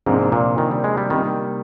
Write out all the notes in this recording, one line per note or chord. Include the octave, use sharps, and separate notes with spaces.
G#2 C3 F3 A#3 D4
A#2
D#3
G3
G#3
G3
C3 D#3 G3 A#3 D#4